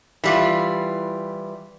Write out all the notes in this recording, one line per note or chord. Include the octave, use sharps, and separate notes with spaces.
E3 G3 F4